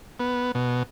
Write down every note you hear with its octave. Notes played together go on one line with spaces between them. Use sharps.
B3
B2